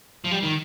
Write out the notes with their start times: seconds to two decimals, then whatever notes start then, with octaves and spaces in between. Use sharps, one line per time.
0.24 F3
0.31 G3
0.43 D#3